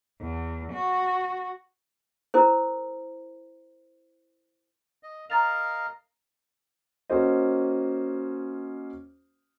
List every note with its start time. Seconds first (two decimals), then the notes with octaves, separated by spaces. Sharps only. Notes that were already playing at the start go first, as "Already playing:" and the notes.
0.21 E2
0.73 F#4
2.34 E4 A#4 C5
5.03 D#5
5.30 A#4 D#5 F5 A#5 A6 F7
7.10 A#3 C#4 F#4 C5 D#5